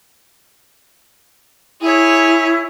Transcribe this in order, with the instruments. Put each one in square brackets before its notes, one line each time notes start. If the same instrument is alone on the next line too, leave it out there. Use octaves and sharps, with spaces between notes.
[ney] E4 [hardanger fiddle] G#4 C#5